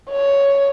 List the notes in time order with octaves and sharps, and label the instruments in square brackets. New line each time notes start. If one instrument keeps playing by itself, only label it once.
[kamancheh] C#5